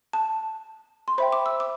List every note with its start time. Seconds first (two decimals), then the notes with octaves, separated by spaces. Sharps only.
0.13 A5
1.08 C6
1.18 C5 E5 G5 B5
1.32 D6
1.46 E6
1.60 D6